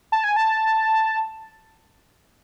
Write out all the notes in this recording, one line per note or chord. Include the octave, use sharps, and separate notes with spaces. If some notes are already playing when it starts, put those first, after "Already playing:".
A5
G#5
A5